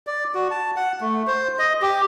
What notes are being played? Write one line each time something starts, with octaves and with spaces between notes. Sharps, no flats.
D5
F#4
A5
F#5
A3
C5
D#5
G4